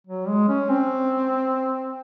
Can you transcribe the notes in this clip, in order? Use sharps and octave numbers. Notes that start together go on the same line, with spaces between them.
F#3
G#3
C#4
C4